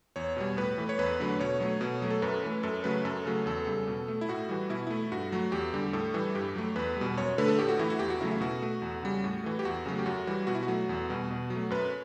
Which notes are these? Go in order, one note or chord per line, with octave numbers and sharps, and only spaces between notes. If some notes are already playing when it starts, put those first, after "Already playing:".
E2 C#5
B2 G3
A2 B4
E3 A3
C#5
E2 B4
D3 F#3 A3
B2 C#5
F#3 A3
B2
F#3 A3
A4
F#2 B4
E3 A3
F#2 A4
C#3 F#3 A3 B4
F#2 A4
C#3 F#3 A3
E2 A4
C#3 G3
B2
A3
E4
A2 F#4
E3 G3
B2 E4
A3 E4
G2 F#4
F#3 A3
E2 G4
D3 G3
A2 A4
E3 G3
G2 G4
F#3 A3
E2 B4
B2 G3
F#2 C#5
D3 A3 B4
A4
A2 G4
F#4
E3 A3 E4
F#4
E2 G4
F#4
C#3 F#3 A3 E4
E4
B2 F#4
A3
E2
C#3 G3
A2
E3 A3
G4
E2 F#4
C#3 F#3 A3
G4
F#2 F#4
E3 G3
B2 F#4
E4
F#4
F#3 A3
E2
B2 G3
B2
F#3
A3
F#2 B4